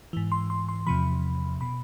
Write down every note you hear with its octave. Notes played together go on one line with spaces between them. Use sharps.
G#2 E3
C6
C6
C6
E2 C3 F3 B5
B2 B5